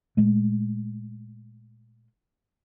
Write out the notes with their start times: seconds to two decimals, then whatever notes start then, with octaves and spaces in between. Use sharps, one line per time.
0.17 A#2 G#3 A3